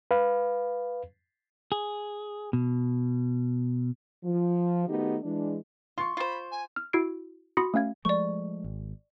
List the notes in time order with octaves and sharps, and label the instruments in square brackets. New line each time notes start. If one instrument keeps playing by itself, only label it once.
[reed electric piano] B4 F5
[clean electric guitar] G#4
B2
[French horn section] F3
D#3 A3 B3 D#4 F#4 G4
E3 G#3 D4
[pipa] F4 [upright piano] C6 C#6
[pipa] F4 C5 [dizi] B5
[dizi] G#5
[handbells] F6
E4 F#4 E6 G#6 C7 D7
F#4 B5 C6 D#6 A#6 C#7
A3 C#4 F5 G#6
[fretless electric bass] F3 G#3 A3 [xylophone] D5 C#6
[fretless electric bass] G#1